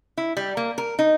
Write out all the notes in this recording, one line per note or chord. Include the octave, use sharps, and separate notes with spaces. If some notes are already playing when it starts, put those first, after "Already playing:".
E4
G3
A#3
A#4
D#4